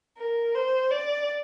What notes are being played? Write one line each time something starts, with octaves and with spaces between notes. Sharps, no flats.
A#4
C5
D5